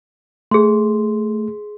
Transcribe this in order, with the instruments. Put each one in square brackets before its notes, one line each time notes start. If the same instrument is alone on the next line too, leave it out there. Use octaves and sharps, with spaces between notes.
[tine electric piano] A3 [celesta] G#4 C6